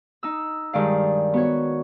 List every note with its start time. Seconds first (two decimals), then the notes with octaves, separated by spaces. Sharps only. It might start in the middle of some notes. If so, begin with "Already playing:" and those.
0.23 D#4 E6
0.73 G2 D#3 G#3 D5 F5
1.34 B3 F#4 C#5